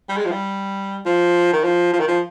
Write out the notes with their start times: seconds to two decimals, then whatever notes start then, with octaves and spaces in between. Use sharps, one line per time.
0.09 G3
0.17 G#3
0.26 F3
0.31 G3
1.05 F3
1.53 D#3
1.64 F3
1.93 F3
2.00 D#3
2.08 F3